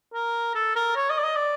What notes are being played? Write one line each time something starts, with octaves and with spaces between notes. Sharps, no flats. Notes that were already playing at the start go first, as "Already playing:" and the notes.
A#4
A4
A#4
C#5
D#5
D5
D#5
D5